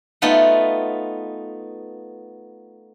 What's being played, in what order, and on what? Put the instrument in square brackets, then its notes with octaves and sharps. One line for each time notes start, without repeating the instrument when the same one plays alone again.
[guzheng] A3 B3 D#4 F4